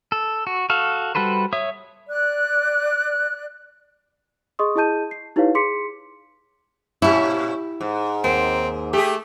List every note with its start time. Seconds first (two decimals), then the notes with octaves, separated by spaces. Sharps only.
0.12 A4
0.47 F#4
0.70 F#4 A4 F5
1.15 G3 F#4 A4 B4 C5
1.53 C#5 E5 D#6
2.09 D5 F#6
4.59 G#4 D#5 C6 C#6 D#6
4.76 E4 G#4 D#5 A5 G6 D#7
5.11 C7
5.36 D#4 E4 G4 B4 C#5 F5
5.55 G#4 C6 D6 B6 C#7
7.02 A#2 C#4 E4 G4
7.81 G#2
8.24 D#2 C4
8.93 A3 G4 G#4